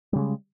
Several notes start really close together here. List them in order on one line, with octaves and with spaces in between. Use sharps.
G3 C#3 G#3